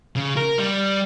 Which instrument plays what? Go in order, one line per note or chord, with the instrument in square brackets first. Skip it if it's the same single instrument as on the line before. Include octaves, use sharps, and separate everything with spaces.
[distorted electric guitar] C#3
A#4
G3